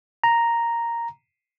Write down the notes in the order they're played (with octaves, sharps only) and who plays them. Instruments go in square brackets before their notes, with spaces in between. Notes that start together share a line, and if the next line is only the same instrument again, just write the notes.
[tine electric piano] A#5